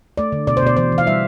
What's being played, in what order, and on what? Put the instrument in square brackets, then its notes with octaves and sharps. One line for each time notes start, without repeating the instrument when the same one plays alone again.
[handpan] A3 D5
D3
B2 D5
C5
B2 D5
E3 C5
E3
F5
G3 E5